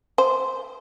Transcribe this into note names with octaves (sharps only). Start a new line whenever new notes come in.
C5